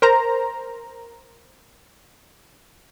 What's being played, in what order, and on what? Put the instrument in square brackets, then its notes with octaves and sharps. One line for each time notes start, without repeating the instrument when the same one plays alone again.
[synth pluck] A#4 C5 A#5